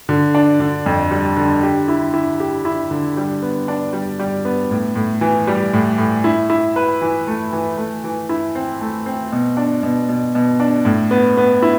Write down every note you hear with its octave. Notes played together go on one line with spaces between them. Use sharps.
D3
D4
D3
F2
G3
D3
G4
E4
E4
G4
E4
D3
G3
B3
D4
G3
G3
B3
A2
A2
E3
G3
A2
A2
E4
E4
B4
E3
A3
E3
A3
E3
E4
C4
A3
C4
B2
D4
B2
B2
B2
D4
A2
B3
B3
E4